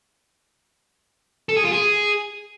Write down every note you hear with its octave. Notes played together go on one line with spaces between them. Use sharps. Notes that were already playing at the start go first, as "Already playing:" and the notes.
A4
G#4
F4
G#4